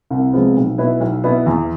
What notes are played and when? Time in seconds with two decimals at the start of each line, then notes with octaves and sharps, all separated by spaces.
0.10 C2
0.33 C3 F3 G#3 B3
0.56 B1
0.78 B2 B3 E4 B4
1.00 B1
1.24 B2 B3 E4 B4
1.46 E2